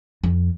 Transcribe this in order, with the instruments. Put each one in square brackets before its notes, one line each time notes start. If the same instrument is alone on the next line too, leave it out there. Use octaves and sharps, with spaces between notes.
[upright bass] F2